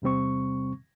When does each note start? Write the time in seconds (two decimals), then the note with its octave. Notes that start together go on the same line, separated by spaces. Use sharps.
0.02 E2 C3 G3 C4 C#6